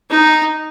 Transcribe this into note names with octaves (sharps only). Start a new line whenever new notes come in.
D#4